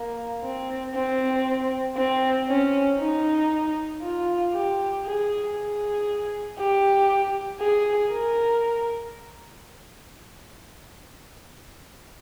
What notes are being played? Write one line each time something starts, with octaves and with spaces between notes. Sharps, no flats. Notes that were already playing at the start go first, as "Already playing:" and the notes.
Already playing: A#3
C4
C4
C4
C#4
D#4
F4
G4
G#4
G#4
G4
G#4
A#4